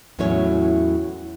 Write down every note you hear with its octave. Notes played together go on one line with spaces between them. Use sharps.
E2 A2 F#3 C#4 E4 C#5